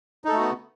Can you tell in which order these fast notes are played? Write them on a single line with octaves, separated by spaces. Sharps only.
D#4 A4 A3 F#4 B3